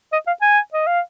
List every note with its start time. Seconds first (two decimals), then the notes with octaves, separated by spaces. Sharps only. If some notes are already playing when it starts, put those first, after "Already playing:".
0.13 D#5
0.27 F5
0.42 G#5
0.74 D#5
0.87 F5